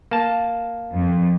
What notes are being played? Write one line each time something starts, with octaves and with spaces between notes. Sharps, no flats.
A#3 A5
F2